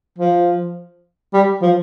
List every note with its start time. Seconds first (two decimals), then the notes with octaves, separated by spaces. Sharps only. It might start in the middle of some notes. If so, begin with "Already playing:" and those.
0.19 F3
1.34 G3
1.62 F3